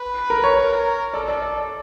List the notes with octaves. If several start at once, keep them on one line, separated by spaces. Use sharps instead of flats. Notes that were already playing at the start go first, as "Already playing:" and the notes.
Already playing: B4
A#4
C#5
A#4
A4 D5
D5
D5